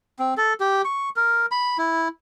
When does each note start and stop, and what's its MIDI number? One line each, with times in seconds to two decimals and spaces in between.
0.19 0.34 60
0.37 0.53 69
0.60 0.82 67
0.85 1.09 85
1.16 1.46 70
1.51 1.77 83
1.78 2.08 64